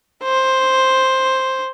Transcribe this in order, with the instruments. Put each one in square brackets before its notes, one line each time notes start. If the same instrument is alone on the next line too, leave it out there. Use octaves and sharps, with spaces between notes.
[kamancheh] C5